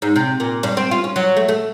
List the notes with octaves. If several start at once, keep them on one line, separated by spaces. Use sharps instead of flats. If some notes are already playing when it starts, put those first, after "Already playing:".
G#2
C3
A#2
G2
C4
F4
C#4
F#3
A3
A3